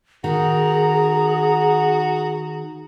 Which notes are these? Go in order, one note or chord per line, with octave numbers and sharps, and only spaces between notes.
D#3 F#4 G#4 A#5